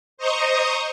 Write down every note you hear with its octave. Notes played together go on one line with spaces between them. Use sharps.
C5 D#5 A#5 C#6 D#6